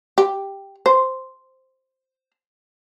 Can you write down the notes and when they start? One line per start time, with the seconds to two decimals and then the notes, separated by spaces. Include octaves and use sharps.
0.18 G4
0.86 C5